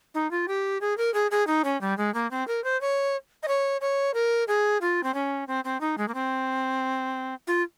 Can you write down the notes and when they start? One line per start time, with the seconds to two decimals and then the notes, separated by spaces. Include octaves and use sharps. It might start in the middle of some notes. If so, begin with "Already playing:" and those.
0.14 D#4
0.31 F4
0.48 G4
0.81 G#4
0.97 A#4
1.14 G#4
1.31 G#4
1.47 D#4
1.64 C#4
1.81 G3
1.98 G#3
2.14 A#3
2.31 C4
2.48 A#4
2.64 C5
2.81 C#5
3.43 D#5
3.48 C#5
3.81 C#5
4.14 A#4
4.48 G#4
4.81 F4
5.03 C4
5.14 C#4
5.47 C4
5.64 C4
5.81 D#4
5.98 G#3
6.08 A#3
6.14 C4
7.47 F4